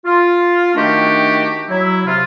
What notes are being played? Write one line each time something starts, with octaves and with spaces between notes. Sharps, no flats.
F4
D#3 A3 D4 F#4 G4
F#3 E4
C3 F4